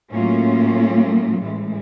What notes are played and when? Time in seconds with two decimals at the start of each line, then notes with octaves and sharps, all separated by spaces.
0.11 A2 F#3 A#3 C#4 F4
1.41 A2 E3 G#3